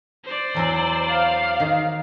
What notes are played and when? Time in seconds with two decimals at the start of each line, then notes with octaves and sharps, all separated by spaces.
0.24 C5 D5
0.54 E2 F#3 E4
1.10 F5
1.60 D#3